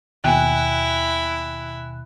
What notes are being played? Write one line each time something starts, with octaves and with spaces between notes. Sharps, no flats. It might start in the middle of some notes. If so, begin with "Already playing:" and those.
D#2 B2 E4 G5 G#5 F#6